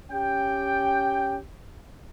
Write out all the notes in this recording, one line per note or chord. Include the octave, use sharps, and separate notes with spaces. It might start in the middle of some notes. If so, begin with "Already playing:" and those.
C#4 G4 G5